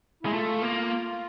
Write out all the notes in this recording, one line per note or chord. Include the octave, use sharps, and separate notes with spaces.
G#3 E4
A3 F4
A#3